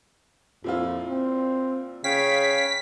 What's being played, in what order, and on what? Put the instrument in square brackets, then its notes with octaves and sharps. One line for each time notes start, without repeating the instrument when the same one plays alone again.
[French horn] F2 [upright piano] A#2 E4 F4
[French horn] C4
[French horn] C#3 [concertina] C#5 F5 G5 [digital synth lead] B6